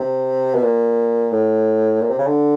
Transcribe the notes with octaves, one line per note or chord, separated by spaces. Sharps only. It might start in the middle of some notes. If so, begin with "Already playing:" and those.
Already playing: C3
B2
A#2
A2
A#2
C3
C#3
D3